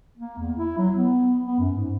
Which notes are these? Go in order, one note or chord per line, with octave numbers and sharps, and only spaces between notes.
A#3
E2
E4
F#3
B3
B3
F#2
G#2